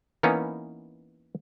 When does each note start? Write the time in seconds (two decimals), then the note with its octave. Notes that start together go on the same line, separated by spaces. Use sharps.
0.23 E3 A#3 B3 C#4 D#4